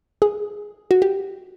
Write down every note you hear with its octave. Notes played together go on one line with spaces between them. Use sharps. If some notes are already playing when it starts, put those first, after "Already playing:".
G#4
F#4
G4